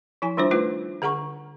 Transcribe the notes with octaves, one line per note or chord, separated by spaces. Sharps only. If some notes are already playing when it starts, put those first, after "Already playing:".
F3 E4 G#5
D#3 G3 D4 F4 C5
A3 D#4 F4 B4
D3 G#4 F#5 A#5 C#6